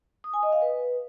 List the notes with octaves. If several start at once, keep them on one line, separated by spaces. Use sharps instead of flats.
D#6
G#5
D#5
F5
B4